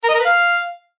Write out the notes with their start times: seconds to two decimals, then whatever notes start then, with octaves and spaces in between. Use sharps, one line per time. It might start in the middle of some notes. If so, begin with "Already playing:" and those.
0.04 A#4
0.09 D#5
0.14 A#4
0.20 B4
0.25 F5